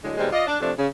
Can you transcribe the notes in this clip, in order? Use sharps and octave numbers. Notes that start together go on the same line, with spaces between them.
A2 D3 F#3 G#3
D#2 B2 G3 G#3 C5
F4 D5 D#5
D4
F2 C3 F3 A3 D4
C#3